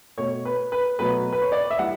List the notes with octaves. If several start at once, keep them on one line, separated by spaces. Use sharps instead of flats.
B2 A3 C#5
B4
B4
B2 F#3 A3 B4
B4
C#5
D5
E5
E3 G3 F#5